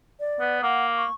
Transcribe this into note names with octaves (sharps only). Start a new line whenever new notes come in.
D5
B3
A#3 F#5
C#6